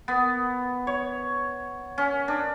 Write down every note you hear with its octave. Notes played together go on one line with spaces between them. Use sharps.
B3
C#5
C#4
D4